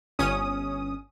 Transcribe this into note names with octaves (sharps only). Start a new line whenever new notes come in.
G1 C#4 D#6